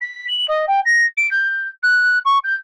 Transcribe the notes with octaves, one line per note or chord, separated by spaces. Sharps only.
B6
F#7
D#5
G5
A#6
D7
G6
F#6
C#6
G6